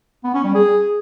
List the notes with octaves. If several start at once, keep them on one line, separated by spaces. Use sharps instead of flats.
B3
C#4
G3
G#4